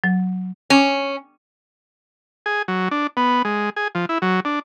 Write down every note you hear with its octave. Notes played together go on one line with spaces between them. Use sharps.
F#3
C#4
G#4
F#3
D4
B3
G#3
G#4
F3
E4
F#3
D4